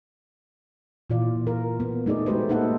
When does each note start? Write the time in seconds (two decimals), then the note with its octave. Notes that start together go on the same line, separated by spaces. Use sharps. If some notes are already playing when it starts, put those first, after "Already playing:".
1.10 A#2 E3 F4 D5
1.47 A#4
1.80 B3
2.06 A3 D#4 G#4 D5
2.26 G#3 A3 F#4 G4 B4 C5
2.49 A#3 D#4 A4 F#5